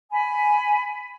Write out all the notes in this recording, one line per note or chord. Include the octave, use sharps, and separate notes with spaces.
G#5 B5